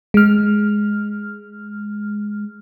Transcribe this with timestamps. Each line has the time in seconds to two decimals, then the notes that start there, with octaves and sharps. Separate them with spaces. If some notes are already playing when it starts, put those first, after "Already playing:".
0.14 G#3 F6